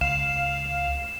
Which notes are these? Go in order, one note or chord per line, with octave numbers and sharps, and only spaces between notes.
C#2 F5 E7